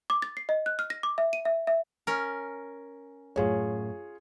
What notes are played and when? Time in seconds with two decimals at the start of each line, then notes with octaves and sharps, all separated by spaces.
0.10 D6
0.22 A6
0.37 C7
0.49 D#5
0.66 F#6
0.79 F6
0.90 A#6
1.03 D6
1.18 E5
1.33 D#7
1.45 E5
1.67 E5
2.07 C#4 A#4
3.36 F#2 A2 F4 G#4 C#5